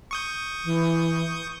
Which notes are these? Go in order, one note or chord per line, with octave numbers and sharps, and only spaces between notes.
C#6 D#6 G6
E3